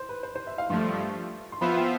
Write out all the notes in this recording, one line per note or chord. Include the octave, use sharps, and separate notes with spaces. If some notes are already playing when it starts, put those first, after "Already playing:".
Already playing: C5
B4
C5
C5
E5
F5
G2 F3 A3 C6
C6
F3 B3 F4 C5 E5 B5
G5